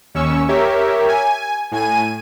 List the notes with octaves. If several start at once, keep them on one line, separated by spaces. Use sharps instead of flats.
D#2 C#4 C#6 E6
G4 A#4 C#5 E5
G#5
A2 G#5 D#7